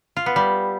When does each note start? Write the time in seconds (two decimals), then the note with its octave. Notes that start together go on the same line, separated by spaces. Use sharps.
0.17 F4
0.26 B3
0.36 G3